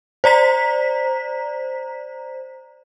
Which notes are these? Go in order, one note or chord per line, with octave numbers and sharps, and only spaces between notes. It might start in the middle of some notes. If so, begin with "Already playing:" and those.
C5 D5 A#5 B6